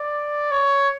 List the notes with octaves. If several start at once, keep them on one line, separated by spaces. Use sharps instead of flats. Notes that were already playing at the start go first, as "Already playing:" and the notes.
Already playing: D5
C#5